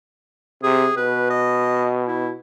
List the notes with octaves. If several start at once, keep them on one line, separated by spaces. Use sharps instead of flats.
C3 G#4
B2 B4
D#5
E4